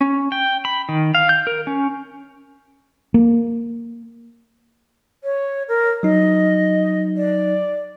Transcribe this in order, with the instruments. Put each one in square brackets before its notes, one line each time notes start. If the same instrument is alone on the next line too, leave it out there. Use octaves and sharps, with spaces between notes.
[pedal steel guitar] C#4
G5
B5
D#3
F5
G6
A#4
C#4
[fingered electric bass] A#3
[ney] C#5
A#4
[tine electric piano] F#3 D#4 [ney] D#5
[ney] D5